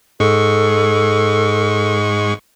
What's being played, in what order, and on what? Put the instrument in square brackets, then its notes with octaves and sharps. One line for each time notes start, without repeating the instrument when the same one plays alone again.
[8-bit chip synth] G#2 G#3 C#6 [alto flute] A4